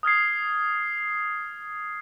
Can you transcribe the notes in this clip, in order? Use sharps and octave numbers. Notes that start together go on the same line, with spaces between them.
D#6 F6 G#6 C7